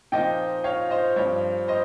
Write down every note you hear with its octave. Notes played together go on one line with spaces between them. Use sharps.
A#2 F3 C4 D#4 D#5 G5
C#5 F5
C5 D#5
G2 F3 C4 C#5
C5 D#5